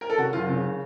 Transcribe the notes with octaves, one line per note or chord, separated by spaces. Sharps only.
A#4
A4
C#3 F#4
F#1 F4
C#3